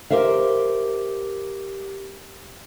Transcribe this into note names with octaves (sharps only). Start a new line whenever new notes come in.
G4 A#4 C5 E5 F5